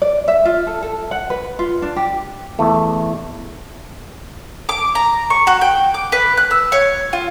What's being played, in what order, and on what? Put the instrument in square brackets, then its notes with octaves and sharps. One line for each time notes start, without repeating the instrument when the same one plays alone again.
[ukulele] D5
E5
F4
A4
A4
F#5
B4
F4
D4
G4
[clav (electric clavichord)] E2 A3
[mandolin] D6
A#5
C#6
F#4
G5
D6
B4
F#6
E6
C#5
F4